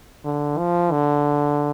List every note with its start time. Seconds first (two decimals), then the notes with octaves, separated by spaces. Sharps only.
0.25 D3
0.58 F3
0.92 D3